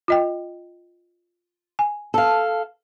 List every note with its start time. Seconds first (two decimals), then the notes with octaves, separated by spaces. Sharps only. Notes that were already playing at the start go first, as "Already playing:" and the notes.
0.08 F4 D#5 G5
1.79 G#5
2.14 A4 F5